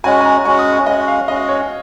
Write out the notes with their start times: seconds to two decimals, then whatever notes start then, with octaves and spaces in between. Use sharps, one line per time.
0.04 G#3 C#4 F#4 G#5
0.21 G#5
0.25 A#5
0.45 G#3 C#4 F#4 C#6
0.59 D#6
0.72 C#6
0.86 G#3 C#4 F#4 D#5
1.08 F5
1.28 G#3 C#4 F#4 D#5
1.49 C#5